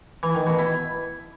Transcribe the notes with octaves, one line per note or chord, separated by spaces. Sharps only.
E3
D#3
B2
E4